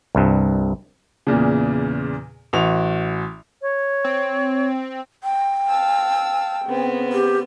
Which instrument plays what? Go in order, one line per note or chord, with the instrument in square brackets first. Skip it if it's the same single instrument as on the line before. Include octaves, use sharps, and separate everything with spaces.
[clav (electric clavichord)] C2 G2
[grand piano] E2 A#2 C#3
A1 F#4 F7
[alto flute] C#5
[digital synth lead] C4
[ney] G5
[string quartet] F5 A5 E6
C#3 B3 C4
[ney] G4